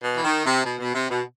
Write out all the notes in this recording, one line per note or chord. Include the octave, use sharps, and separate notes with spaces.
B2
E3
D#3
C3
B2
B2
C3
B2